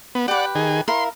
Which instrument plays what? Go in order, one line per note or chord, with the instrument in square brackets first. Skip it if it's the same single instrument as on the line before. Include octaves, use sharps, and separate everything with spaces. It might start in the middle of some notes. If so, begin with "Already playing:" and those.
[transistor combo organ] B3
[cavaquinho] G4 B4 [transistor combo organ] D5 F#5
[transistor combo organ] D#3 G#4
[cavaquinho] E4 A#4 F5 [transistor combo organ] C6